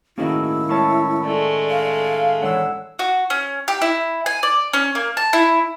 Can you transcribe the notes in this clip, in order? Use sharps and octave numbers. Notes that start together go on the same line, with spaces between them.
A2 D#3 A#3 C#4 E4 F#4 G#4
G#3 C#4 C#5 A5 C#6
G#3 A3 D5
F5
E3 G#3 D4 C#5 F#5 E6
F#4
C#4
G4
E4
G#5
D5
C#4
A#3
A5
E4